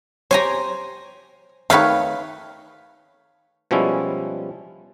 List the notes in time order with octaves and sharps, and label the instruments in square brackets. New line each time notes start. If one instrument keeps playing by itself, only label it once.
[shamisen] G4 C#5 [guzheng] C5 G#5 A#5
[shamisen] D#3 A3 [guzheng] B4 C#5 F5
[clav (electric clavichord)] B2 F3 G3 G#3 C#4 E4